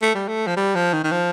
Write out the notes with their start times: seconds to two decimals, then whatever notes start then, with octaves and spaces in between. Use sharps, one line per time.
0.02 A3
0.15 G3
0.28 A3
0.47 F3
0.56 G3
0.75 F3
0.93 D#3
1.04 D#3
1.12 F3